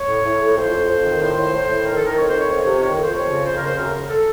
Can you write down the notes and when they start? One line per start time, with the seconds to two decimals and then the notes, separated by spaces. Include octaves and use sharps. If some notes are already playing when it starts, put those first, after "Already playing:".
Already playing: C#5
0.08 A2
0.24 A2
0.40 A2
0.56 F2 C5
0.72 F2
0.89 F2
1.04 D#3
1.21 A2 C5
1.37 A2
1.53 A2
1.69 A2
1.85 D#3 A#4
1.96 A4
2.01 D#3
2.06 A#4
2.17 F2 C#5
2.28 C5
2.33 D#3
2.39 C#5
2.49 F2 C#5
2.65 C3
2.81 D#3 C#5
2.97 F2
3.03 C5
3.13 F2 C#5
3.29 C#3
3.45 F2 C5
3.56 A#4
3.61 C#3
3.66 C5
3.77 F#2 A#4
3.93 F#2
4.10 A4